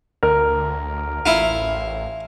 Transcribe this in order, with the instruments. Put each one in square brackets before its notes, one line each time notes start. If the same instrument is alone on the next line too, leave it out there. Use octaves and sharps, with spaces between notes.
[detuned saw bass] D2 [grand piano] A#4
[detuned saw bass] A1 [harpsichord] E4 F4